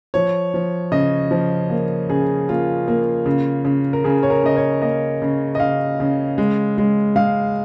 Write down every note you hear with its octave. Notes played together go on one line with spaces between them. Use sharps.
F3 C#5
F3
C#3 D#5
F3
A#3
C#3 G#4
A#3 F4
A#3
C#3
C#3
A#4
C#3 G#4
C#5
A#4
C#3 D#5
C#5
A#3 D#5
C#3
D#5
C#3 F5
C#3
G#3
G#3
G#3 F5